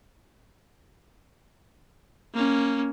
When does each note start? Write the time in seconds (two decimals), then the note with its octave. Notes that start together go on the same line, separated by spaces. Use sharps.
2.34 A#3 C#4